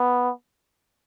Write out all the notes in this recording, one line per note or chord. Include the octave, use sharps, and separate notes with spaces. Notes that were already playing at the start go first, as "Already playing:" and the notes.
Already playing: B3